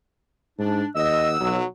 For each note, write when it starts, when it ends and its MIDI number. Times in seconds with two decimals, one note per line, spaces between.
0.59 0.83 44
0.59 0.86 62
0.96 1.39 39
0.96 1.32 75
0.96 1.57 78
0.96 1.57 87
0.96 1.57 88
1.41 1.62 35
1.41 1.66 54